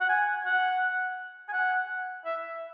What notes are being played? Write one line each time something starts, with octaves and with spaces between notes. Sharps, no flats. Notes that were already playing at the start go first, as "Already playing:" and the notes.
F#5
G#5
F#5
G#5
F#5
E5